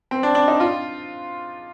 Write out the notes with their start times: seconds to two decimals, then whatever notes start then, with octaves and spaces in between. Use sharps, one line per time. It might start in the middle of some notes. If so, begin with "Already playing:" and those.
0.11 C4
0.23 D4
0.35 D4
0.48 D#4
0.60 F4